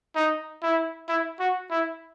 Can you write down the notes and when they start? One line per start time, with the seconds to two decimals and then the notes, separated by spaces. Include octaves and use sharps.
0.16 D#4
0.63 E4
1.09 E4
1.40 F#4
1.71 E4